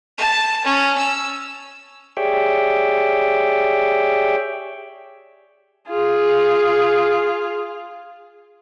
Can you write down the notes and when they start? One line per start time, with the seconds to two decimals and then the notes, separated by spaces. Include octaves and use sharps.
0.18 A5
0.64 C#4
0.98 E6
2.17 G4 G#4 C#5 D5 E5 G5
5.88 F4 G#4